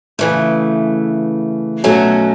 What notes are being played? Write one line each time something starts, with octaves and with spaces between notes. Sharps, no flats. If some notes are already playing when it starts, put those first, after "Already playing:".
C#3 E3 A3
B2 F#3 A3 C#4 F#4